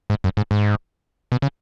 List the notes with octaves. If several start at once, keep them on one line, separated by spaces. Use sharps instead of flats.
G#2
F#2
G#2
G#2
B2
C#3